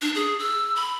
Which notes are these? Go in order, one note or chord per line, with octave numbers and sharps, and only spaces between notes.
D4
G#4
E6
B5